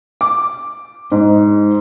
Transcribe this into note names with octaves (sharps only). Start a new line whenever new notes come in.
D6
G#2